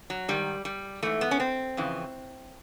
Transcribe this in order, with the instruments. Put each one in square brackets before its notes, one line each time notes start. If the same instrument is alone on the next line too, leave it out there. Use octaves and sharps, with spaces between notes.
[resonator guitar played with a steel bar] F#3
G#2 D#3 G3
G3
G#2 E3 A3
B3
C#4
C4
F2 C#3 E3